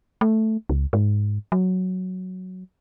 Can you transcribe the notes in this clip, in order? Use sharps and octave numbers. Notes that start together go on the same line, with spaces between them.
A3
C#2
G#2
F#3